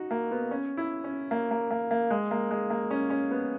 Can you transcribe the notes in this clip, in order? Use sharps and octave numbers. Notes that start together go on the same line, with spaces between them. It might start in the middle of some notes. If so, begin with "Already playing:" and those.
Already playing: D#4 F#4
A#3
B3
C#4
E4
C#4
A#3
A#3
A#3
A#3
G#3
A#3
G#3
A#3
C#4
C#4
B3